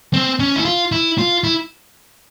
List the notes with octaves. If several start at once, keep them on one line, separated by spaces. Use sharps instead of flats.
C4
C#4
E4
F4
E4
F4
E4